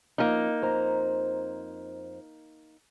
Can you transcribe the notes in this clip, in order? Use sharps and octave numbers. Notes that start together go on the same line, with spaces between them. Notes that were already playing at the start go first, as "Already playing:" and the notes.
F3 A#3 C#4 D#4
F2 C5 A#5